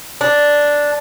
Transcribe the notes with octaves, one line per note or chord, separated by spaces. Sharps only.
D4